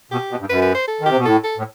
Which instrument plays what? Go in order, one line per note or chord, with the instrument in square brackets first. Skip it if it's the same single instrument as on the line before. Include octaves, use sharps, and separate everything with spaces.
[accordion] B2 [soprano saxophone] G4
[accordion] B2
G2
[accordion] F#2 [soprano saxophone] B4
[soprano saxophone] B4
C5
A4
[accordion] D#3
[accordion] C3 [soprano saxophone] G4
[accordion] B2
[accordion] A2 [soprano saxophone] A4
[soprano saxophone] A4
[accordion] A2